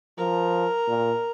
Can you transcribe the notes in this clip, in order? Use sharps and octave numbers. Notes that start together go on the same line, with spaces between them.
F3 A#4
A#2